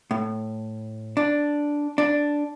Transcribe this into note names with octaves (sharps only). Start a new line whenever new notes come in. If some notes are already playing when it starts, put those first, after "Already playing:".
A2
D4
D4